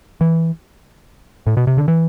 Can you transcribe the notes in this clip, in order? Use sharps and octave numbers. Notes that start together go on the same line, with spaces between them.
E3
A2
B2
C3
D3
E3